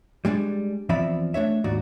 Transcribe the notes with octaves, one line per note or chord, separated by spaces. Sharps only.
G3 G#3 D4
E2 F3 C4 D5 E5 B5
A3 D4 C#5 E5
D#2 G#2 F#4 D5